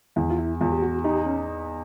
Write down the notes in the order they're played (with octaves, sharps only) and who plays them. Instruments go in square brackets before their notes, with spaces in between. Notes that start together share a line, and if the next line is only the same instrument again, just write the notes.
[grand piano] E2 [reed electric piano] E4
[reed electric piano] F4
E4
[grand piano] E2 [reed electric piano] F4
[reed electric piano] G4
F#4
[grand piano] D#4 [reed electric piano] G4
[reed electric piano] C#4